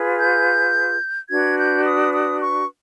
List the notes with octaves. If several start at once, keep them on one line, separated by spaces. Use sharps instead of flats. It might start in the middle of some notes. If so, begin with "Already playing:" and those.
Already playing: F4 G#4 B4
G6
D4 F#4 B4 G#6
G6
D#6
D#6
C#6